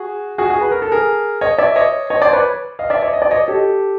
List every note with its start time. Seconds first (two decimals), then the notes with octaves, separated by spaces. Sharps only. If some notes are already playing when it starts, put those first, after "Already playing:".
Already playing: F#4 G#4
0.38 F#4 G#4
0.50 F#4 G#4
0.61 B4
0.71 A#4
0.82 A4
0.92 G#4 A#4
1.41 C#5 D#5
1.58 D5 E5
1.76 C#5 D#5
2.10 C#5 D#5
2.22 C5 D5
2.33 B4 C#5
2.79 D#5 F5
2.90 D5 E5
3.02 C#5 D#5
3.13 D#5
3.22 D5
3.31 C#5 D#5
3.48 G4 A4